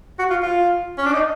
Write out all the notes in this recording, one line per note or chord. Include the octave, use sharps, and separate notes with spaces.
F#4
F4
F4
C#4
D4
D#4